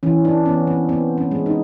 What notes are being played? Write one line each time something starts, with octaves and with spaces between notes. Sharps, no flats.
E3 C#4
D4
B3 C#4
C4
B3 C4
C#4
G#3
D#4